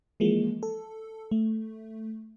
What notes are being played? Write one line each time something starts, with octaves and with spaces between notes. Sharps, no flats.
E3 F3 G#3 A#3
A4
A3